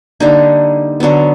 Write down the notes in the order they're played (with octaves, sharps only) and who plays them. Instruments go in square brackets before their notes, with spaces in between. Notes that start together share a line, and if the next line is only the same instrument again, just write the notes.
[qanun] D3 G3 A#3 D#4
D3 F#3 B3